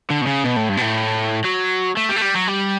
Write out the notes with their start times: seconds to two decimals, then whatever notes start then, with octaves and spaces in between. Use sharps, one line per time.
0.10 D3
0.21 B2
0.27 C#3
0.44 B2
0.56 A2
0.69 G2
0.77 B2
0.82 A2
1.45 F#3
1.97 A3
2.09 G3
2.16 A3
2.22 G3
2.35 F#3
2.47 G3